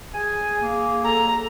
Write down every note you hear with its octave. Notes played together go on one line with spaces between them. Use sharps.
G#4 G#5
A#3
A4 A#5